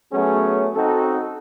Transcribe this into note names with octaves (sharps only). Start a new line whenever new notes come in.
F#3 A3 B3 C#4 G#4
C4 D#4 F#4 A4